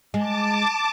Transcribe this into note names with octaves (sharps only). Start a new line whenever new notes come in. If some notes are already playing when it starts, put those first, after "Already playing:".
G#3 A5 D6